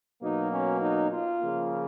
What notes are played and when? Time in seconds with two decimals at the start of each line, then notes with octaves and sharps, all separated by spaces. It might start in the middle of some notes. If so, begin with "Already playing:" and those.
0.22 B2 F#3 A#3 D#4
0.52 C#4
0.82 D#4
1.12 F4
1.42 C#3 F3 A#3